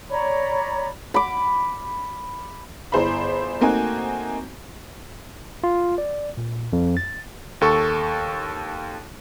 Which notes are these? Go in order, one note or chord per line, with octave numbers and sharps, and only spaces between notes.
C#5 D5 A#5 B5
B5 D6
G1 E4 G#4 C5 A#5 B5
A3 A#3 C4 D#4 F#4 G#5
F4
D5
A#2
F2
A6
D#2 A4 C#6